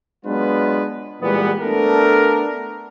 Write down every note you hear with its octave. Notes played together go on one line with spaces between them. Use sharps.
F#3 G#3 B3 D4 F4 B4
A#2 E3 G3 G#3 B3
A3 B3 D4 A4 A#4